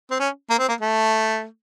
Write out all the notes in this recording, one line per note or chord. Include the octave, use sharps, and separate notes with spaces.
C4
C#4
A#3
C4
A#3
A3